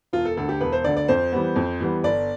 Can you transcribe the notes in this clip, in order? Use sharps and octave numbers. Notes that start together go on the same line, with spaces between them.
E1 F4
A4
D2 D3 A4
G4
E1 B4
C5
D2 D3 D5
D5
F2 C5
E3 G3 B3
F2
E3 G3 B3
G1 D5